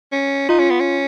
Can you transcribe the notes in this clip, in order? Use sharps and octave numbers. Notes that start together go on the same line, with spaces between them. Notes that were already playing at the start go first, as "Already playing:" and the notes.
C#4
D#4 F4
C#4
B3
C#4